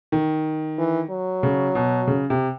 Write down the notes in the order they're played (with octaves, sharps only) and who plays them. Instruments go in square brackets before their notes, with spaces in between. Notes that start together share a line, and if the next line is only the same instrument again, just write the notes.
[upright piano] D#3
[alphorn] E3
F#3
[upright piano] C#3
B2
C#3
C3